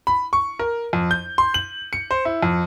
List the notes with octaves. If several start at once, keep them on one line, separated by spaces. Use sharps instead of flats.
B5
C#6
A#4
F2
G6
C6
F#7
C#7
C5
E4
F2